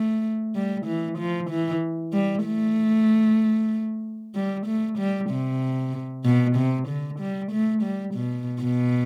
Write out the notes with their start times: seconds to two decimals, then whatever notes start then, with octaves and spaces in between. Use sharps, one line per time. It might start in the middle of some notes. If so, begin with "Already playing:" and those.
Already playing: A3
0.55 G3
0.86 E3
1.19 F3
1.50 E3
2.13 G3
2.45 A3
4.35 G3
4.67 A3
4.98 G3
5.30 C3
6.25 B2
6.56 C3
6.88 D3
7.20 G3
7.52 A3
7.83 G3
8.15 B2
8.62 B2